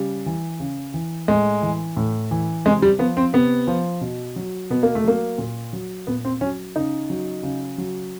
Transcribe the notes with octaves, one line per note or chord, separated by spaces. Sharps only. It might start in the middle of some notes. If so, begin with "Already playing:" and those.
Already playing: C#3 G3
E3
C#3
E3
A2 G#3
E3
A2
E3
C3 G#3
G3
F3 B3
C4
C3 B3
F3
B2
F#3
B2 B3
A#3
A3
F#3 A#3
A#2
F#3
A#2 B3
C4
F#3 C#4
C#3 D#4
F#3
C#3
F#3